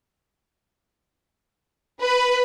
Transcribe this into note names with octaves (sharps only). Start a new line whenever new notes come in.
B4